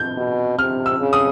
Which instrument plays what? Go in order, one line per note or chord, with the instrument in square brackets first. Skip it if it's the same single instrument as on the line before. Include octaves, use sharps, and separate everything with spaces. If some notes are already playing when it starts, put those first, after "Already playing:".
Already playing: [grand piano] G6
[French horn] B2
[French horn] C3 [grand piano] F6
[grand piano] E6
[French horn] C#3
[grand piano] D#6